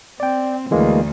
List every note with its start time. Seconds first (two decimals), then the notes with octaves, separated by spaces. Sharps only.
0.20 C4 D5 G5
0.71 D2 E3 G#3 A#3